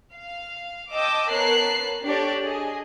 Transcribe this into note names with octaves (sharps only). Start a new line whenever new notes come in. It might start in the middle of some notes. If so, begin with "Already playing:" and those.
F5
D#5 G5 A5 D6 E6
B3 A#4 C#5 A5 F#6 C7
D4 G4 A4 C#5 D5
G#4 D#5